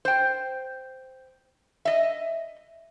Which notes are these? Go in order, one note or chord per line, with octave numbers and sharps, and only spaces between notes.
C5 G5
D#5 E5